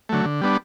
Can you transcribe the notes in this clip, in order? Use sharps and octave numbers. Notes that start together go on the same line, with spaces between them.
D3 F#3 A3
D3
G3 B3 D4